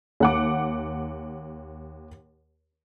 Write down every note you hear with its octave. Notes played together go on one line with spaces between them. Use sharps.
D#2 F#5 D6